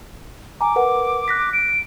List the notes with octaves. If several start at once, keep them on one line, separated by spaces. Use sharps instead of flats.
G#5 A#5 D6
A#4 B4 F#5
F#6 A#6 B6
D7